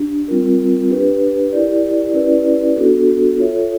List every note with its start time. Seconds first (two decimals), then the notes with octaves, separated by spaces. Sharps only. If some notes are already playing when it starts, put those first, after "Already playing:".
Already playing: D4 G4
0.28 G3 C4 F4 A#4
0.90 D4 G4 B4
1.52 E4 G4 A#4 D5
2.14 C#4 E4 G4 B4 D5
2.76 B3 D4 F#4 A4
3.37 F4 A4 C#5 E5